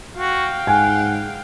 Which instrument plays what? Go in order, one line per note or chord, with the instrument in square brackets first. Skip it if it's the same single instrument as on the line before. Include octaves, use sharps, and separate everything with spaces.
[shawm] F#4 [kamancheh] F5 G5
[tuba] G#2 [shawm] F#5 [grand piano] G#5